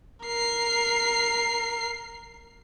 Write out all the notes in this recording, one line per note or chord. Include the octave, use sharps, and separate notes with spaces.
A#4 C7